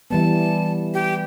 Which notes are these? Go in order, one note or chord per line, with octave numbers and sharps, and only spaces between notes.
E3 G3 B3 A5
G4